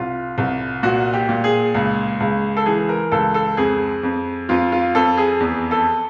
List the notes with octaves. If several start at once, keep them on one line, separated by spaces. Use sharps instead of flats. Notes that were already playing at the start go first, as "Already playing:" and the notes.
Already playing: C2 F4
C2
A#2 F#4
G4
A#2
G#4
C#2
C#2
A4
E3 G#4
A#4
C#2 A4
A4
F2 G#4
F2
F2 F4
F4
F2 A4
G#4
E2
A4